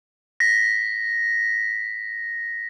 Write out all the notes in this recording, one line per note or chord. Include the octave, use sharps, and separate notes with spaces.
A#6 B6